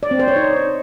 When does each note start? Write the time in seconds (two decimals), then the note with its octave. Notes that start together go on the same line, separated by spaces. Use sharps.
0.03 D5
0.11 C4
0.19 C5
0.28 C#5
0.36 D#4